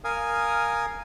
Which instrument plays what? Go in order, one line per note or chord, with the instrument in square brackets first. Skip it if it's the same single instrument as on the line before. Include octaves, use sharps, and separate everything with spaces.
[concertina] A#4 F5 G#5 D#6